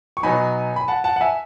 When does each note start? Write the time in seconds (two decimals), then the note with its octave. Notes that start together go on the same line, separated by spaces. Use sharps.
0.17 C#6
0.23 B2 F#3 B3 D#4 G#5 B5
0.76 B5
0.88 F#5 A5
1.04 F#5 A5
1.16 F#5
1.21 E5 G#5